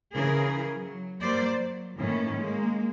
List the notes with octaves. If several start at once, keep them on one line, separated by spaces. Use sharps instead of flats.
C#3 E3 G#4 A#4
F#3
G3 A#3 C5 D5
F#3
A2 D#3 E3 A#3 C#4
G#3 A#3